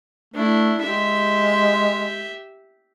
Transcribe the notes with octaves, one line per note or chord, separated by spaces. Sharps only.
A3 D4 E4
G#3 G4 E5